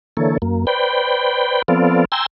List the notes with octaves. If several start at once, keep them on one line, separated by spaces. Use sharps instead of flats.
D3 E3 A#3 A4 C#5
F#2 A#3
B4 C5 D5 G5 B5
F3 B3 C4 A4 D5 F5
G5 G#5 A#5 C6 E6